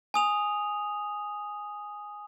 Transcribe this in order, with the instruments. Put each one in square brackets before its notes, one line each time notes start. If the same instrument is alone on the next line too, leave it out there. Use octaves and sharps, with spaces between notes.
[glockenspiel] G#5 D#6 F7